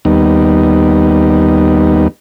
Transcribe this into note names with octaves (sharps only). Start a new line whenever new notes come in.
D#2 G3 B3 D#4